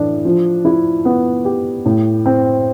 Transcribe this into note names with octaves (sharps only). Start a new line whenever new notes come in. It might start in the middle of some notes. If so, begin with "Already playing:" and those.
Already playing: A2 E3 D4
F3
E4
B3
G4
A2
C4